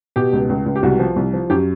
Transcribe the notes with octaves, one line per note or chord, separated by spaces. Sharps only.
B2 G4
C#2
C#2
C#2
G4
C2 F#4
F3
C2
F3
F#2 G4